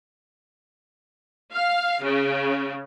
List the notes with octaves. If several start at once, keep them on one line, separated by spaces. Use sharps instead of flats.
F5
C#3